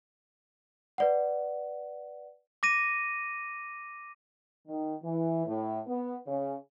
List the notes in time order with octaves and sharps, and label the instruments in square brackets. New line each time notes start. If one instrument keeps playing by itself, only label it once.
[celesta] B4 D5 F#5
[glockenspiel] D6 A#6 D#7
[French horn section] D#3
E3
A2
B3
C#3